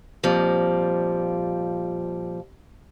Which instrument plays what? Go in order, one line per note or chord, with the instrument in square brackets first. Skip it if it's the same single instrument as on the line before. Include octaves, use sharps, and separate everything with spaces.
[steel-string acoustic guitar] F2 A#2 F3 G3